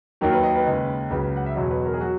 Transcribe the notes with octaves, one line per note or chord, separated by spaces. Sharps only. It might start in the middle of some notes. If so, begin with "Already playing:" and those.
D#2 D#3 F#3 A#4
B4
D#5
B4
D#2 C#3 G#3
C#2 C#3 F#3 B4
F#5
E5
E2 B2 F#3 D#5
B4
A#4
G#4
F#3 F#4